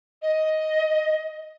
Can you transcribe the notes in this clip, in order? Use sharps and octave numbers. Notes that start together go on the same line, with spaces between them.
D#5